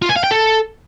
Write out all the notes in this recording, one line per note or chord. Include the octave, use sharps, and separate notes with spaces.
F4
G#5
F5
G5
A4